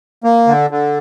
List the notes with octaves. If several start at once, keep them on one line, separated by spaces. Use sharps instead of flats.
A#3
D3
D3